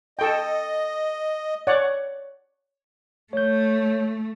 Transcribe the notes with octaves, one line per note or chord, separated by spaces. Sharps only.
A4 D#5 G5
C#5 D5 F#5
A3 C#5 G6